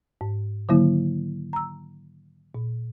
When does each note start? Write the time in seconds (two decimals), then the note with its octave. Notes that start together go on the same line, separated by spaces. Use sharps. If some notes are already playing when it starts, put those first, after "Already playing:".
0.21 G#2
0.69 D3 D#3 F#3 A#3 E4
1.53 A#5 E6
2.55 A#2